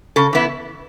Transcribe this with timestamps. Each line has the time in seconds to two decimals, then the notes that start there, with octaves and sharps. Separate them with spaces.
0.16 C#3 A4
0.33 E3 B3 E4